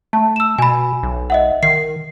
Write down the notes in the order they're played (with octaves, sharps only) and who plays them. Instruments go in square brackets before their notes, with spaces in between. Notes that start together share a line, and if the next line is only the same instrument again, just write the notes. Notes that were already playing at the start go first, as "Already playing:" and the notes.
[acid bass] A3 [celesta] A5
[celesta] E6 E7
[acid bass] B2 [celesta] G#5 B5
[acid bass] B1
[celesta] D#5 E5 F#5
[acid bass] D#3 [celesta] C7